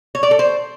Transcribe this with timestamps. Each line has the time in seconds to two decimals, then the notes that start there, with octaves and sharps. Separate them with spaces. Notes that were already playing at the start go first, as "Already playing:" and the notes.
0.15 C#5
0.23 D5
0.31 A4
0.39 C5